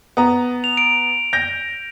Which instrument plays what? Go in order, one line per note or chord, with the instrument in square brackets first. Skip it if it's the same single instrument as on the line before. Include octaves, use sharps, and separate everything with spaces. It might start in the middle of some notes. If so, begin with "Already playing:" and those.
[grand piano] B3 A#5
[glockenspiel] F7
D7
[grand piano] G6 A#6